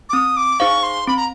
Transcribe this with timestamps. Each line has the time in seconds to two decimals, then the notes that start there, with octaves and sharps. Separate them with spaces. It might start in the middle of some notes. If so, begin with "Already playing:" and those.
0.09 D6
0.13 C4 D#6
0.37 D6
0.60 D#4 G#4 C5 F5 C#6
0.83 C6
1.07 C4 B5
1.17 A#5